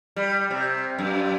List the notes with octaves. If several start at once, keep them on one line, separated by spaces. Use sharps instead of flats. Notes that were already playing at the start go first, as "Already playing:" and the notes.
G3
C3
F#2